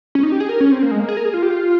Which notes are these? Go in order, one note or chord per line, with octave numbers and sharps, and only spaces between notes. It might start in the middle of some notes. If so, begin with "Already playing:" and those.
C#4
D#4
G4
G#4
A#4
C#4
C4
A#3
G#3
A#3
G#4
A#4
G#4
F4
G4
F4